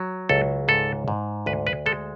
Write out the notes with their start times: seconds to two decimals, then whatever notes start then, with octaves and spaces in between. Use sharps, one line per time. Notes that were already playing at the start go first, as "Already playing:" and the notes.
Already playing: F#3
0.29 C#2 A4
0.68 G#2 A4
1.08 G#2
1.46 D2 B4
1.67 B4
1.86 G#3 A4